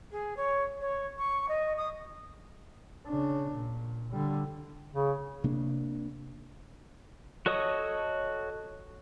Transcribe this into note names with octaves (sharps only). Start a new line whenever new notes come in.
G#4
C#5
C#5
C#6
D#5
D#6
C#3 D4
A#2
D3 G3
C#3
C3 A#3 D4
F#4 A4 C#5 D#5 D#6